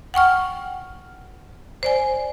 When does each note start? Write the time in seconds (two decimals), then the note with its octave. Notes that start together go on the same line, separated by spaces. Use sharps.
0.14 F#5 G5 C#6 F6
1.83 C5 D5 G#5